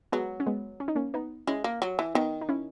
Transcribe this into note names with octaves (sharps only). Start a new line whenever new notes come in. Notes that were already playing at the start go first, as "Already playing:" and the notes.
F#3 G#3 B3
C#4
G#3 B3
C#4
D#4
A#3 C#4
B3 D#4
G#3 C#4 E4
A#3
F#3
E3
D#3 B3 D#4
D#4
C#4 E4